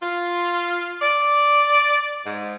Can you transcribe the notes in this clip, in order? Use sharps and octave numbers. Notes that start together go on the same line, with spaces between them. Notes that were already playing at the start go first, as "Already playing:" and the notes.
F4
D5
G#2